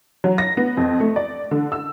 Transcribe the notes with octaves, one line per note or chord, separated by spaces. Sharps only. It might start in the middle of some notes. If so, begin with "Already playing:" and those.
F#3
A#6
B3
F2
A3
D5
D3
E6